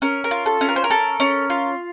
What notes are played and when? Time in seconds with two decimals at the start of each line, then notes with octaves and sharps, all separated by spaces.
0.02 C#4 A#4
0.24 A#4
0.31 F4
0.46 A4
0.61 C#4
0.69 A#4
0.76 C5
0.84 A#4
0.90 A4
1.20 C#4
1.50 F4